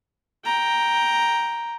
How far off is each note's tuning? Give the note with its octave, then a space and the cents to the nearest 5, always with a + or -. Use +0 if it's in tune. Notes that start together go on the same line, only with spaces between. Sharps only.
G5 +0 A#5 +5